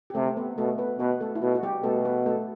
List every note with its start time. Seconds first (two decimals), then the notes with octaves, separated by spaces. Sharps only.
0.10 G4
0.15 C3 A3 A4
0.37 B3 B4
0.58 B2 A3 A4
0.78 B3 B4
0.99 B2 B3 B4
1.21 A3 A4
1.35 E4
1.42 B2 F#4
1.55 F#4
1.63 G3 G4
1.83 B2 A3 A4
2.05 B3 B4
2.26 A3 A4